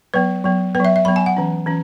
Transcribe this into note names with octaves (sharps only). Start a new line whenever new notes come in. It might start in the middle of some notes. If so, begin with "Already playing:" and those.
F#3 B3 B4
F#3 B3
B3 B4
F#3 E5
E5
F#3 B3 B5
G#5
F#5
E3 C#4
E3 C#4